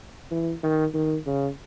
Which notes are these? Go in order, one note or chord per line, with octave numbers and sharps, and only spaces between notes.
E3
D#3
D#3
C#3